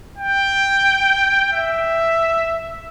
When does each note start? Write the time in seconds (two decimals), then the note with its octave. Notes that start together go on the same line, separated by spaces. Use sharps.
0.18 G5
1.53 E5